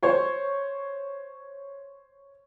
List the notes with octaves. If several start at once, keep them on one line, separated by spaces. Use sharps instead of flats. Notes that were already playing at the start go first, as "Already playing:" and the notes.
C5 C#5